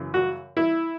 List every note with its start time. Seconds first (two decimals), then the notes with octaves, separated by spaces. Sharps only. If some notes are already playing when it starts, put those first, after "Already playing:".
Already playing: F#2 C#3 E3
0.14 F#4
0.57 E4